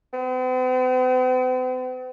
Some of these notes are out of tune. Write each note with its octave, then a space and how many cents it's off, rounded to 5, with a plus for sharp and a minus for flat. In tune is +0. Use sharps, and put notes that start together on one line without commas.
C4 -45